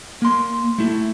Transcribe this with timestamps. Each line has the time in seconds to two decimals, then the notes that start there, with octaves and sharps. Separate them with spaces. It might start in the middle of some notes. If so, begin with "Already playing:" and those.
0.22 A#3 C6
0.78 A3 E4